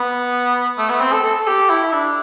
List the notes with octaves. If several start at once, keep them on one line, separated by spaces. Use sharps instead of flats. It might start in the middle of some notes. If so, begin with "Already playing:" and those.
Already playing: B3
A3
B3
C4
A4
A4
G4
E4
E4
D4